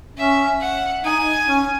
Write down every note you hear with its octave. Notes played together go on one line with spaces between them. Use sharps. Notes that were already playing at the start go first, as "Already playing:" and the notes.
C#4 E5
F#5
D#4 G#5
C#4